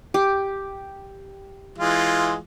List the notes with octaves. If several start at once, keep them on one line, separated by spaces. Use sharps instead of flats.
G4
E3 G#3 F4